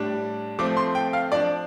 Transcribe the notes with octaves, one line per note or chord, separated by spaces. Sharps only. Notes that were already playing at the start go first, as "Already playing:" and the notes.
Already playing: A2 G3 D4
F3 A3 C4 D6
C6
G5
F5
F3 D4 D5